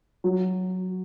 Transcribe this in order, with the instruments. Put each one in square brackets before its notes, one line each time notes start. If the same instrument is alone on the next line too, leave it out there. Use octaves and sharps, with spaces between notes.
[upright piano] F#3